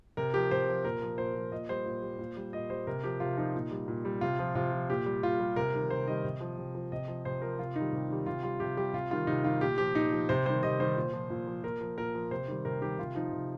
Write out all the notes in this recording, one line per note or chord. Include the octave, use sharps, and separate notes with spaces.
C3 A#4
F3 G4
C3 C5
F3
A#2 A#4
F3
A#2 C5
F3
A#2 D#5
G3 C5
A#2
G3
A#2
G3
A#2 D#5
G3 C5
C3 A#4
F3 G4
C3 F4
F3 D#4
A#2
G3
A#2
G3
C3 F4
F3
C3 F4
F3
A#2 G4
G3
A#2 F4
G3
C3 A#4
D#3 G3
C3 C5
D#3 G3 D#5
C3
F3
C3
F3
C3 D#5
F3
C3 C5
F3 A#4
C3 F4
D#3 D#4
G3
C3
D#3 G3
C3 F4
G3 F4
C3 G4
G3 G4
C3 F4
D#3 G3 F4
C3 D#4
D#3 G3 F4
A#2 G4
F3 G4
A#2 D#4
F3
C3 C5
D#3 G3 C5
C3 D#5
D#3 G3 C5
A#2
F3
A#2
F3
A#2 A#4
F3
A#2 A#4
F3
C3 C5
D#3 G3
C3 A#4
D#3 G3 G4
C3 F4
F3 D#4
C3